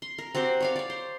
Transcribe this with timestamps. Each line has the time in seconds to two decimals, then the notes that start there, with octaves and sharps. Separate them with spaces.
0.02 C6
0.18 A#4
0.35 C4 F#4 G4 C5
0.60 C#5 D5 F5
0.76 C#5 D5
0.90 C5